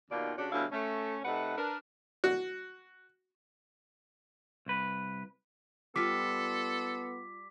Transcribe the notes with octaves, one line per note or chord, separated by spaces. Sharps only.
D#2 B2 D#3 A#3 F4 D5
C#3 D4 F#4 G4 C#5 D5
D2 B2 G3 E4 C#5 F5
A3 C#4
C3 A3 D#4 B4 F#5
D4 A#4 B4
F#4
C2 B4
G3 B3 F4 A4 D6 B6